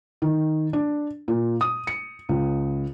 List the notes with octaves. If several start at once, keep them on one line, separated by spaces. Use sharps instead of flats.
D#3
D4
A#2
D#6
C#7
C#2